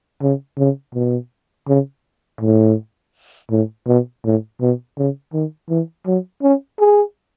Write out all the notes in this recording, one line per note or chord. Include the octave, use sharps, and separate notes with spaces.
C#3
C#3
B2
C#3
A2
A2
B2
A2
B2
C#3
D#3
E3
F#3
C#4
G#4